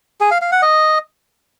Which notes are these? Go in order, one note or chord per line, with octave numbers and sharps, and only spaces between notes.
G#4
F5
F5
F#5
D#5